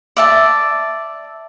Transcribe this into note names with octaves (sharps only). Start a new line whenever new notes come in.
D5 E5 A5